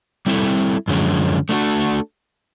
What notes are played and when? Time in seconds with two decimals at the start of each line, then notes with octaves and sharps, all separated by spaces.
0.26 G3 C4 E4 A4
0.88 F#2 D3 F3 G#3 C#4
1.49 A3 D4 F#4 A4